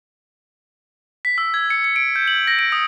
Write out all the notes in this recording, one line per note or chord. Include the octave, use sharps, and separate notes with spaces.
B6
E6
G#6
C#7
C#7
D7
G6
F#7
A#6
D7
D#6